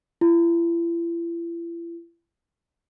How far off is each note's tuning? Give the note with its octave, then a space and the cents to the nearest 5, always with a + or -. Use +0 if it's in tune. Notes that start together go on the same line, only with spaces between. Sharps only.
E4 +40